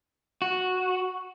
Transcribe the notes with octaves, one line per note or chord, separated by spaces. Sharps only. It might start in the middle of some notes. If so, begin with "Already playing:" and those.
F#4